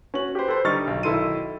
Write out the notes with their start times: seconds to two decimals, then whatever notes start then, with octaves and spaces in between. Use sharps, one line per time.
0.14 C#4 F#4 F#7
0.35 G4 B4 C5
0.48 A4 B4 C5
0.65 D3 G3 D#4 C#6 F6 A6
0.87 B1
1.03 B1 D#3 E4 A4 C6 D#7